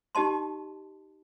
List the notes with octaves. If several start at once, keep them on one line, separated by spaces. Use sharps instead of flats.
D#4 G4 D#5 A5 C6